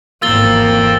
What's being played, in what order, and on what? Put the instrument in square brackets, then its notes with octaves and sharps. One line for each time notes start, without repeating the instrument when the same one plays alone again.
[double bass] G#1 E2 [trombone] A#3 [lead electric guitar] C4 F4 [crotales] E6 A6 G7